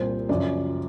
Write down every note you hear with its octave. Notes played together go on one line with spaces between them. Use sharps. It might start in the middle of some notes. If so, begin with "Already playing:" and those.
Already playing: C2 A#2 G3 C5
F#2 C#3 F3 D5